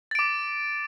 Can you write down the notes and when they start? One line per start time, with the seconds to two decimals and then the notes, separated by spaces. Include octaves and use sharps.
0.11 A6
0.15 D7
0.19 D6